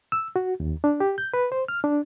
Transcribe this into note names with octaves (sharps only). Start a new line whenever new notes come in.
E6
F#4
D#2
D4
G4
G6
B4
C5
F6
D4